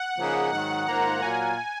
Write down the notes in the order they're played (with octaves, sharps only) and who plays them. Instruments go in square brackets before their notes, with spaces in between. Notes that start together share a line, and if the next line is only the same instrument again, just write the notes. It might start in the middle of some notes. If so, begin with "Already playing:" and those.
Already playing: [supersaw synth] F#5
[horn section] C#3 F3 A#3 D#4 G#4
[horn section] G#2 D#3 F#3 [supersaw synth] F#5
[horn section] G#2 D#3 A#3 F4 C5 [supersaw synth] A#5
[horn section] A#2 F#3 A#3 F4 [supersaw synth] G#5